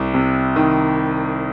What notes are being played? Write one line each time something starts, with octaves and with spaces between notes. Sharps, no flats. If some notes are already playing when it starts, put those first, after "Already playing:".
Already playing: C2
C3
D#3